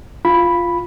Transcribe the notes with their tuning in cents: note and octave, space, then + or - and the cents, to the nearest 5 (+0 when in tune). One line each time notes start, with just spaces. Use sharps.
F4 +0 B5 +0